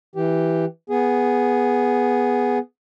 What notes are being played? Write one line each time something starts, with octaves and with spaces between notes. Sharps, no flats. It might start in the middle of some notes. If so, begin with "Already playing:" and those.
E3 G4
B3 G#4